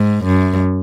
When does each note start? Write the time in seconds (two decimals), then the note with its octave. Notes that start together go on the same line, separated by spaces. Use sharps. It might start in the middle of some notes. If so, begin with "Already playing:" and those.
Already playing: G#2
0.24 F#2